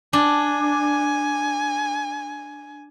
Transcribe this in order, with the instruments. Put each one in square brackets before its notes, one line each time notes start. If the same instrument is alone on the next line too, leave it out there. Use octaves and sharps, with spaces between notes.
[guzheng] D4 [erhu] G#5